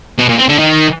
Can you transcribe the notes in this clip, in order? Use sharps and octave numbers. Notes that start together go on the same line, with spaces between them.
B2
A#2
C4
D3
D#3